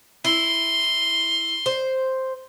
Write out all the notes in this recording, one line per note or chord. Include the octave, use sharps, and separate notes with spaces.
E4 C6
C5